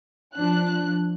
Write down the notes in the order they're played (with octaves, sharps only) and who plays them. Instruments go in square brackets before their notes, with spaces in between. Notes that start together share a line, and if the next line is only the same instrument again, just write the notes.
[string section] F3 D4 F#6